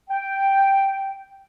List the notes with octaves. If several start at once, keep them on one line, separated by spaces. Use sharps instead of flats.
G5